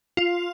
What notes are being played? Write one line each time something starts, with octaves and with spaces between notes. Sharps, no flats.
F4